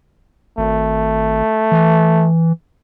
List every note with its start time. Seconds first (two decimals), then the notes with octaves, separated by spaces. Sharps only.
0.58 G#1 A3
1.72 E3